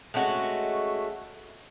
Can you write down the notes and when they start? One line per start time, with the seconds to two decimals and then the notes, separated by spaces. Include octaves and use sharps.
0.14 G#3 A3 C#4 F#4